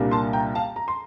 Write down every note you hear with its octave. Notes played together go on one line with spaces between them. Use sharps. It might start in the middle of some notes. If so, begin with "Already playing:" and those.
Already playing: C2 A#2 G3 A#3 D4
A5 C6
G5 A#5
F5 A5
A#5
C6